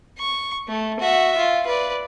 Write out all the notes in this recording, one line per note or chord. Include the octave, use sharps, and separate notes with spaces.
C#6
A3
F#4 E5
F4
B4 D5